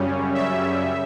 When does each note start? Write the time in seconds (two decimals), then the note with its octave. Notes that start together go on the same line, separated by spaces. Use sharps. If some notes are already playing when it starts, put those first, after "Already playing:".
Already playing: F#2 C#3 G3 C#4
0.34 E5